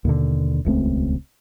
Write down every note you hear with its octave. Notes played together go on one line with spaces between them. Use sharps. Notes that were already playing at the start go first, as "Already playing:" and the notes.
D#2 B2 D3
D#1 C#2 A3 C4